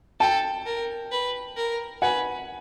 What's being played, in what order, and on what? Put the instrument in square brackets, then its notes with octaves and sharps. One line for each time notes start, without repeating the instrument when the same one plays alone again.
[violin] A4 [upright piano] G5 A5
[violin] A#4
B4
A#4
[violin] B4 [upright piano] F#5 G#5